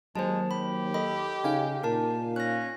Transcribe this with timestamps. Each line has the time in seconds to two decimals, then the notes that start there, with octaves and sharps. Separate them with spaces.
0.16 D#2 F#3 G#3 C5 A5
0.51 G4 B5
0.94 A4 D#5 B5
1.44 C#3 D#4 F5 G#5
1.84 A#2 A#4 A5
2.36 C#4 F#6 A#6